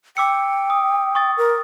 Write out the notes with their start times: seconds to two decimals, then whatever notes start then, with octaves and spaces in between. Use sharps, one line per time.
0.17 G5 D6 E6 C#7
0.70 D#6
1.15 C#6 D#6 A6
1.37 A#4